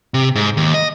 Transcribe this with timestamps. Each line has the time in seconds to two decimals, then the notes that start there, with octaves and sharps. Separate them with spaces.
0.14 C3
0.35 G#2
0.57 D#2
0.74 D#5